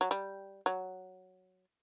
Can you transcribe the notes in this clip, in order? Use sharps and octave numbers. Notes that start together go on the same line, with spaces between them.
F#3
G3
F#3